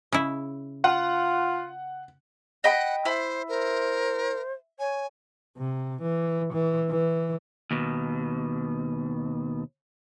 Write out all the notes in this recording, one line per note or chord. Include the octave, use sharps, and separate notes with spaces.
C#3 E4
F4 F#5
D#5 F#5 G5 B5
E4 C5
A#4 C5
C#5 G#5
C3
E3
E3
E3
D#2 B2